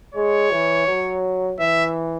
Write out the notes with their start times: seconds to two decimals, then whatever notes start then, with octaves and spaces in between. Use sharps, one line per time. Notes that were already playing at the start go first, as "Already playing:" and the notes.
0.14 G#3 C#5
0.51 E3
0.88 F#3
1.59 E3 E5